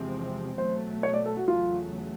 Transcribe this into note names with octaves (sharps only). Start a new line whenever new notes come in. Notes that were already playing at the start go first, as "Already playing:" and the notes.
Already playing: E2 C3 F3 G#3 C4
B2 F#3 A3 C5
C#5
D5
A4
F#4
E2 C#3 F#3 A3 F4